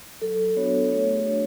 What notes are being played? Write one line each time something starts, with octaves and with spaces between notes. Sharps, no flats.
F#3 A4
B3 D4 F#4 C#5
A3 C#5
G#4
D4 F#4